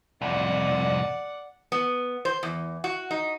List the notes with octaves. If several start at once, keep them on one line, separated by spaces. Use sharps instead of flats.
C2 F2 D5 F#5
B3
C5
E2
F#4
D#4